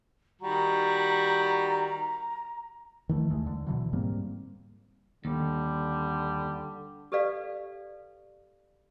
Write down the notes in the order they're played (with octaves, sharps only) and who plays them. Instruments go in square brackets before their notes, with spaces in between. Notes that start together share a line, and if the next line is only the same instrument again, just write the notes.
[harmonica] D#3 G3 F#4 [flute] A#5
[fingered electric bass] D#3 E3 A3
D#2 G#3 A3
D3
B2 D3 E3 F#3
G#2 G3 A#3 C4
[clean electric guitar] D#2 [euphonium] D3 [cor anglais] G3
[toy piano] G4 A4 B4 D5 F5